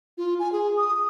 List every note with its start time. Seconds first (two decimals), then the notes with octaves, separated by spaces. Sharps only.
0.18 F4
0.39 G#5
0.52 G#4
0.77 D#6